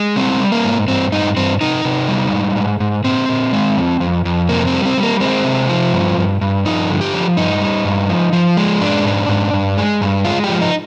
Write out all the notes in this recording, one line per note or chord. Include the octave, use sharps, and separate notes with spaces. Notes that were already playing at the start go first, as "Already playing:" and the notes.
Already playing: G#3
G3 C4
G3
A#3
G#2
G2 C4
G2 D#4
G2 C4
C3 D#4
C3
G3
G#2
G#2
G#2
A#2 C4
A#2
G#3
F2
F2
F2
C3 A#3
C4
G3
C4
G3
A#3
G#3 C4
C3
F3
G2
G2
G2
F3 D#4
D3
G4
F3
G2 D#4
G3
G2
F3
F3
G#3
G#2 D4
G#2
G#2
G2
G#3
G2
G#3 F4
G4
F3
D#4